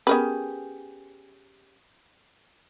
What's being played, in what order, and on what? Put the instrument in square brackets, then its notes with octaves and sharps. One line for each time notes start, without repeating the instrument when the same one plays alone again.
[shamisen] B3 A#4 B4 [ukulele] C#4 G4 G#4